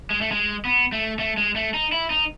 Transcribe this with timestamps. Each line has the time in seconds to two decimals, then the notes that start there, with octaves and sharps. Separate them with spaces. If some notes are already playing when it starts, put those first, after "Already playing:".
0.10 G#3
0.21 A3
0.32 G#3
0.65 B3
0.92 A3
1.19 A3
1.37 G#3
1.56 A3
1.74 D#4
1.92 E4
2.10 D#4